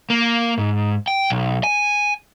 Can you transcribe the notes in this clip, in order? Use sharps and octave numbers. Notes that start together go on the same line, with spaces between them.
A#3
G#2
G5
B1
G#5